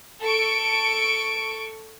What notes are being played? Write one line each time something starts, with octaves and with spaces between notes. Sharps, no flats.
A4 C#6 D7